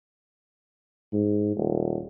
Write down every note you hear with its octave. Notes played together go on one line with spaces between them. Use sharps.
G#2
D#1